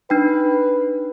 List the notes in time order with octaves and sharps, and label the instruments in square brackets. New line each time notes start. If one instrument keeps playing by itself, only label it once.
[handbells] D4 D#4 G5 [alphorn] B4